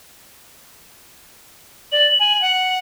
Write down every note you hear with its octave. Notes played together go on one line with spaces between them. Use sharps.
D5 F#7
G#5
F#5